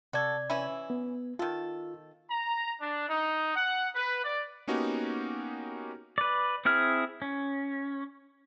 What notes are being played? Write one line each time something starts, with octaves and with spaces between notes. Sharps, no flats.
C3 F#4 A4 D5 G#6
E3 C#4 E4
B3
D#3 F4 A4
A#5
D4
D#4
F#5
B4
D5
A#3 B3 C#4 D#4 F#4 G4
B4 D5
C4 E4 G#4 F6
C#4